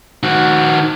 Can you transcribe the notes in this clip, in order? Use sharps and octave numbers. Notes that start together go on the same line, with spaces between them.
D#3 F#4